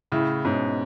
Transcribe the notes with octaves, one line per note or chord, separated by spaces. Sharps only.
A2 C#3 E4
G#2 B2 C#4